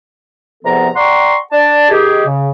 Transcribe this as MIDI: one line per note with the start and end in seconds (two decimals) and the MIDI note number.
0.64 0.88 40
0.64 0.88 48
0.64 0.88 53
0.64 0.88 59
0.64 0.88 69
0.64 0.88 82
0.96 1.37 74
0.96 1.37 78
0.96 1.37 79
0.96 1.37 82
0.96 1.37 84
0.96 1.37 85
1.52 1.89 62
1.52 1.89 74
1.52 1.89 81
1.90 2.24 51
1.90 2.24 67
1.90 2.24 68
2.26 2.50 49